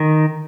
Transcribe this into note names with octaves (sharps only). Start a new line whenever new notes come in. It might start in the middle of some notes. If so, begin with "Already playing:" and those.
Already playing: D#3